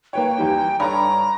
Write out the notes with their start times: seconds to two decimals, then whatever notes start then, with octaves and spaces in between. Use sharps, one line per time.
0.13 A#3 B4 C#5 G5
0.37 E2 G3 D#4
0.80 G2 A4 C#5 D5 A#5